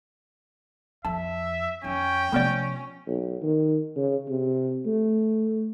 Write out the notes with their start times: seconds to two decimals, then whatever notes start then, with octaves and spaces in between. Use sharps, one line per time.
1.05 F2 E5 A5
1.84 F2 C#4 G5
2.32 C3 F3 A3 B3 C#4 D5
3.07 B1
3.42 D#3
3.96 C#3
4.28 C3
4.86 A3